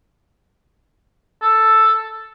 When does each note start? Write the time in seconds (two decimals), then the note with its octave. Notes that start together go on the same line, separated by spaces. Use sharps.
1.42 A4